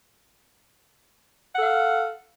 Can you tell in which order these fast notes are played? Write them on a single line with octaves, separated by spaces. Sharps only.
F#5 A4 F5